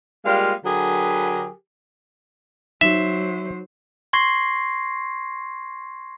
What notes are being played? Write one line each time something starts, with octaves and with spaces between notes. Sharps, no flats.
G3 G#3 A#3 F4 F5
D3 F#3 G4 G#4 A#4 B4
F#3 D#4 C5 E5
C6 C#6 G#6 A#6 C7